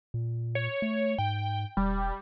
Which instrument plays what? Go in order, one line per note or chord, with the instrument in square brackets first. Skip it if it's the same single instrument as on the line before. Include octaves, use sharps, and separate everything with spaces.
[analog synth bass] A#2
[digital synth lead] C#5
[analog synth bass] A3
[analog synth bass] G#2 [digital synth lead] G5
[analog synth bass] E1 [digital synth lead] G3